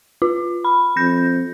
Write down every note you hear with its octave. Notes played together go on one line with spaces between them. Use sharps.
F4
B5
F2 G6 A#6